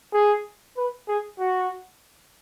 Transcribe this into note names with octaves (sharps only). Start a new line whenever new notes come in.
G#4
B4
G#4
F#4